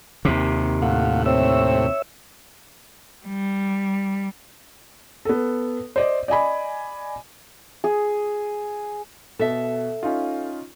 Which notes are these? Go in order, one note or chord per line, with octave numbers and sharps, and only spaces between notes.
D#2 C3
A2 F5 F#5
C4 C#5 E5 E6
G3
B3 A4
C5 D5 D#5
D5 D#5 G#5 B5
G#4
B2 A4 E5
C#4 D#4 F4